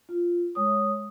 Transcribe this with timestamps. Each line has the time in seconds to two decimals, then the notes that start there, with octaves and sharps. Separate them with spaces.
0.09 F4
0.55 G#3 C#5 D#6